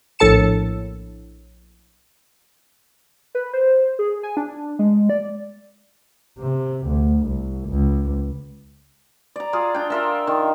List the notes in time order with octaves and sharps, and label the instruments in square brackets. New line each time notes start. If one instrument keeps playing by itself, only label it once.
[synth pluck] A#1 A2 A4 A5 C#7 E7
[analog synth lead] B4
C5
G#4
G#5
D4
G#3
D5
[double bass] C3
D2
C2
C#2
[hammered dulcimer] D5 A#5
F4 G#4
D4 G5
F4 A#4 E5
D#3